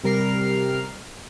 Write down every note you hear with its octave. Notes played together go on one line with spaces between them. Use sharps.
C3 G3 A#4 F6 C7